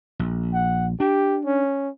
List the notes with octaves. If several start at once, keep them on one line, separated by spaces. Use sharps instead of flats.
A#1
F#5
D4 G4
C#4